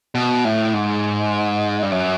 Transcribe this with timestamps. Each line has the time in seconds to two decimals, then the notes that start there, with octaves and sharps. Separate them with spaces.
0.15 B2
0.45 A2
0.74 G#2
1.82 G2
1.92 F#2